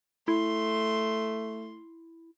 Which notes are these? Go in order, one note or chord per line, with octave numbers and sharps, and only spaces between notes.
A3 E4 C6